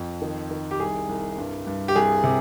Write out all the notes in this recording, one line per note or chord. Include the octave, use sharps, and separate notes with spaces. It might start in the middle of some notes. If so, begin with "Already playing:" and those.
Already playing: F2
D#3
D#3
G4
C2 G#4
C2
G2
G2
G4
C2 G#4
C3